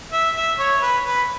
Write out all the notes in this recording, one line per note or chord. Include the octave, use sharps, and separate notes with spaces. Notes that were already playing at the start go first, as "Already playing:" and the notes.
E5
E5
C#5
B4
B4